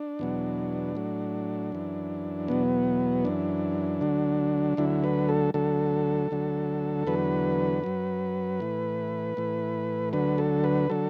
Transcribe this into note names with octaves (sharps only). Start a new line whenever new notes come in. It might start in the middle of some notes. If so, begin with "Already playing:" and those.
Already playing: D4
E2 B2 F#3
A2 F#3
F#2 E3
E2 B2 F#3 B3
F#2 E3 D4
D2 D3 F#3
D2 D3 F#3 E4
B4
A4
D2 D3 F#3 A4
D2 D3 F#3
E2 D3 F#3 B4
F#2 F#3
A2 E3
A2 E3
D2 D3 F#3 B4
A4
B4
D3 F#3 A4